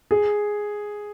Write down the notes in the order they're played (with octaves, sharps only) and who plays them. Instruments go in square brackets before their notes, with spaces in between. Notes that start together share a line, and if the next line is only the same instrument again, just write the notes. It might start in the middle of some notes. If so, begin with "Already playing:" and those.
[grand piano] G#4